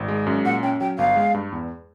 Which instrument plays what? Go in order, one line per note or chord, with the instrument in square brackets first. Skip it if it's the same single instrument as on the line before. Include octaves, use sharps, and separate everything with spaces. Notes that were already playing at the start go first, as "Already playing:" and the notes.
Already playing: [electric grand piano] G#1
G#3
F#2
[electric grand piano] A#2 [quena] F#5
[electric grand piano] C#4 [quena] G5
[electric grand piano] F#3 [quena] G5
[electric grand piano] G1 [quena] F5
[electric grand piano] G#3
G2
E2